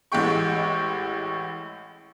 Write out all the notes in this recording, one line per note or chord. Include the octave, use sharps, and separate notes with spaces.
A1 A2 G#3 G5 C#6